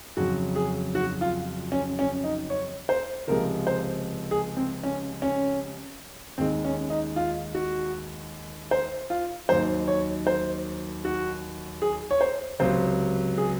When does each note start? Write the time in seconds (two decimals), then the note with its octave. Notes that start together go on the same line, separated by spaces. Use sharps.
0.17 F2 C#3 F#3 F#4
0.56 G#4
0.95 F#4
1.21 F4
1.72 C#4
1.99 C#4
2.24 D#4
2.50 C#5
2.89 C5
3.28 C#2 C3 F3 G#3 A#4
3.67 C5
4.31 G#4
4.57 C4
4.83 C#4
5.22 C#4
6.38 D#2 D#3 G#3 C4
6.65 C#4
6.90 D#4
7.16 F4
7.55 F#4
8.71 C5
9.10 F4
9.49 D#2 D#3 F#3 C5
9.88 C#5
10.27 C5
11.05 F#4
11.82 G#4
12.11 C#5
12.21 C5
12.60 C#2 C3 F#3 C5
13.38 G#4